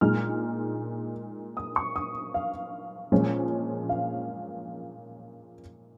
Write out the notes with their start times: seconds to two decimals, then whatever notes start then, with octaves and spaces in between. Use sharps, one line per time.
0.01 A#2 G#3 D#4 F6
1.57 D#6
1.76 C#6
1.96 D#6
2.34 F5
3.12 A#2 F3 G#3 C#4
3.89 F5